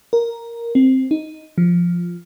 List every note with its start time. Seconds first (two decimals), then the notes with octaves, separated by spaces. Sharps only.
0.13 A#4
0.75 C4
1.11 D#4
1.58 F3